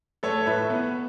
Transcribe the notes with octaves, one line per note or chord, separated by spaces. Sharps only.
A3 A4 C#5
A2 B4 E5
B3